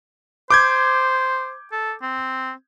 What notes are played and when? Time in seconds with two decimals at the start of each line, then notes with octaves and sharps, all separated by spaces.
0.50 C5 D6 G6 G#6
1.72 A4
2.02 C4